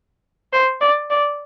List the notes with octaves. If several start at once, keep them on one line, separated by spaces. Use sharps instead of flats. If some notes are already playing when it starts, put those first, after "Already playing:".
C5
D5
D5